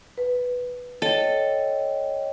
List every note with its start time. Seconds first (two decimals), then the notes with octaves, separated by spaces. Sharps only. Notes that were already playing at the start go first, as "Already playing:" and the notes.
0.18 B4
1.02 A4 C#5 D#5 G5